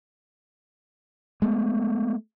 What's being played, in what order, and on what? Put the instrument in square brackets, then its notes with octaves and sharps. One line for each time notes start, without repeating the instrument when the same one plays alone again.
[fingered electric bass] G#3 A3 B3